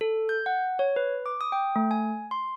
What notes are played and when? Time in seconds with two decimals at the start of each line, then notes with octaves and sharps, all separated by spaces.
0.01 A4
0.29 G6
0.46 F#5
0.79 C#5
0.96 B4
1.26 D6
1.41 D#6
1.52 G5
1.76 A3
1.91 G#5
2.31 C6